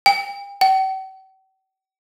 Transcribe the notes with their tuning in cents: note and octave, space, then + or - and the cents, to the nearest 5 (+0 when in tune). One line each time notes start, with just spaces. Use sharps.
G5 +40
G5 -45